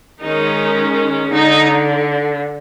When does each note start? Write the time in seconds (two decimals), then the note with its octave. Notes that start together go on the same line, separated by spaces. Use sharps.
0.22 D#3 G#3 C#4 D#4
1.31 D3 D#4